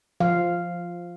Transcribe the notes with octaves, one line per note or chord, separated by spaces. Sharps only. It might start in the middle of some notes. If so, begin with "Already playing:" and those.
F3 F5